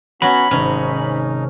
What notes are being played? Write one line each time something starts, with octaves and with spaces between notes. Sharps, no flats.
F#3 B3 C#4 F#4 B5
G#1 C3 C#4 D#4